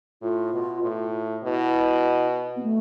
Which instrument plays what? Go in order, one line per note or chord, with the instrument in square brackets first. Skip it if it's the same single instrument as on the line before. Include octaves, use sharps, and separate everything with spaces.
[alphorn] A2 [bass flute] F4
[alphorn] B2
A2
[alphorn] B2 [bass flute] E4
[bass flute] B3
A3